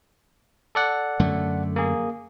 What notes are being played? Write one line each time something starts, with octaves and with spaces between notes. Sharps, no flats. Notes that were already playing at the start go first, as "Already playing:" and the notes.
A4 D5 F#5
F#2 D3 A3
A#3 G#4